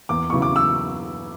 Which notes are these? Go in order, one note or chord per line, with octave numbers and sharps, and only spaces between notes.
E2 D6
C#3 F#3 B3 E4 C#6
D6
E6